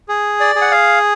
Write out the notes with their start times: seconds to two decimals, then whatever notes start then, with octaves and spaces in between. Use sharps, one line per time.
0.08 G#4
0.40 D5
0.55 G#4
0.61 F#5
0.71 F5